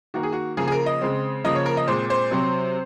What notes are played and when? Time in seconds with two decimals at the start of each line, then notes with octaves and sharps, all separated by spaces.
0.14 D#3 A#3 F#4
0.23 G#4
0.32 F#4
0.57 C#3 F3 A#3 G#4
0.67 G#4
0.72 A#4
0.86 D#5
1.01 C#3 G#3 C4
1.44 C#3 F3 A#3 D#5
1.55 C#5
1.66 A#4
1.77 D#5
1.87 A#2 G#3 C4 C5
2.10 C5
2.31 C3 F#3 C4